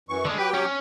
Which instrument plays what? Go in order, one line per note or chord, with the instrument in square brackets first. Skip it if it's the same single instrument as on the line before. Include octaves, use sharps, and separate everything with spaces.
[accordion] F#2 E3 C#6
[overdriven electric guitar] D3 G#3
[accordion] F#3 G4 G5 [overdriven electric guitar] B4
[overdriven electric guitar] C#4